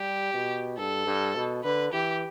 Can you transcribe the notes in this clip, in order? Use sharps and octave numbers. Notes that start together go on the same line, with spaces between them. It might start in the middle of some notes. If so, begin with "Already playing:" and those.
Already playing: G3 G4
B2
G2 A4
G2
B2
D3 B4
E3 G4